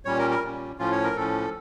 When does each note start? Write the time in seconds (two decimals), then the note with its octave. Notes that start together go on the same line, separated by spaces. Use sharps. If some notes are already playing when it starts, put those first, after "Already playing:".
0.05 A#2 G3 C#4 C#5
0.18 A#4
0.30 A#4
0.42 A#2 G3 C#4
0.79 A2 F3 C#4 F4
0.92 C#5
1.04 A#4
1.16 A2 F3 C#4 A4